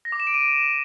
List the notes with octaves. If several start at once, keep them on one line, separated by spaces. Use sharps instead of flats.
A#6
D6
E7
D7
D#7